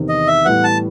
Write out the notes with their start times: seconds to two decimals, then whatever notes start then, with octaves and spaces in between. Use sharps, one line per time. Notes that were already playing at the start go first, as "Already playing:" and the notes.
Already playing: E2 C3 D#3
0.09 D#5
0.27 E5
0.45 A2 E3 G3 B3 F#5
0.64 A5